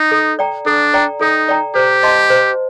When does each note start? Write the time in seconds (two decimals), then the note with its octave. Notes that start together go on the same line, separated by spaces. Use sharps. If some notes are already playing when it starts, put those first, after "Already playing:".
Already playing: D#4
0.11 A4
0.39 D5 G5 A#5
0.66 D4 A4
0.94 D5 G5 A#5
1.21 D#4 A4
1.48 D5 G5 A#5
1.75 G4 C5
2.03 D#5 A5 C6
2.30 C5